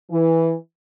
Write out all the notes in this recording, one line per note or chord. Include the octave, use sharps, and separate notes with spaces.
E3